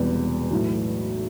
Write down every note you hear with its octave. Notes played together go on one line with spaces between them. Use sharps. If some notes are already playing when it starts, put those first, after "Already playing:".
Already playing: E1 E2 C3 G3 B3
B1 A2 E3